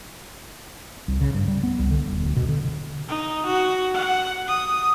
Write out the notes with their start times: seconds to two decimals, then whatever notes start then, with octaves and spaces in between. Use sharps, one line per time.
1.08 C2
1.21 C#3
1.34 G2
1.48 G3
1.63 B3
1.79 C2
1.91 D3
2.10 D#1
2.24 D2
2.37 B2
2.49 D3
3.09 D#4
3.46 F#4
3.94 F#5
4.48 D#6